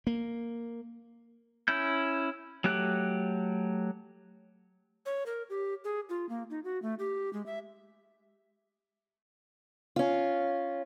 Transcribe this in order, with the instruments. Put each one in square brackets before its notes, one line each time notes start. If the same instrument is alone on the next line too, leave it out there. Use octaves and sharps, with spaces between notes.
[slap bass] A#3
[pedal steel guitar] C#4 E4 G6
F#3 A3 G4 F#6
[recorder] C#5
A#4
G4
G#4
F4
A#3
D#4
F#4
A3
G4
G#3
E5
[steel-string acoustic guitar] C#4 F4